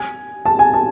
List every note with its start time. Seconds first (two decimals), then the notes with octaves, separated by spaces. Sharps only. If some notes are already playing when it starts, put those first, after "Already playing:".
Already playing: G#5
0.46 A5
0.59 G#5
0.74 A5